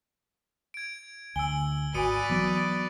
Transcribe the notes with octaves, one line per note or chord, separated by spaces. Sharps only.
G#6 D7
D2 G#5 E6 D7 G7
G#1 F#4 B4 D5 G#5 D#6 C#7 D#7
E3 F#3 B3 B5 D6